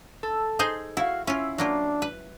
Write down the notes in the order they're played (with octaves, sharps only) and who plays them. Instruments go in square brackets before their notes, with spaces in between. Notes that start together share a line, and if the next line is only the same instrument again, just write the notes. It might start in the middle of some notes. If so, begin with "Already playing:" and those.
[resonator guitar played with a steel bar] A4
[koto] D#4 G#4 C5
[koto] E4 [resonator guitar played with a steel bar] F#4 F5
[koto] C#4 F4 [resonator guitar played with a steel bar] E4
[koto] F#3 A#3 F4 [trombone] D4
[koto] B4